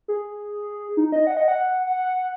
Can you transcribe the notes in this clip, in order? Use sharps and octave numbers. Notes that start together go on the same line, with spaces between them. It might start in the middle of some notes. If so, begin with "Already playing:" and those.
G#4
D#4
D#5
F#5
D#5
F#5
F#5